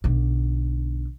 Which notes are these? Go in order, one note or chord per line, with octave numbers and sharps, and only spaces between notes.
B1 D3